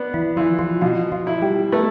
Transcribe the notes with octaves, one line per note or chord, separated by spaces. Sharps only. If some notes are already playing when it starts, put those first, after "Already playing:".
Already playing: B3 D4
E3 E4
E3 F3 F4
F3 F4
B2 F3 F4
F3 F4
E4
G3 G4
A3 B3 B4